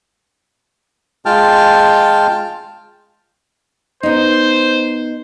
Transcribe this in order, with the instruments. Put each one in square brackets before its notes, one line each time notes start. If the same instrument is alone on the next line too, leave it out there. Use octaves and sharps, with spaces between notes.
[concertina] G#3 F4 G5 A5 F6
[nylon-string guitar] B3 D#4 [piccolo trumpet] C5